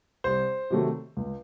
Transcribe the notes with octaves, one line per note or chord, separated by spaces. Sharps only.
C2 C5
C3 D#3 F#3 A3
C#2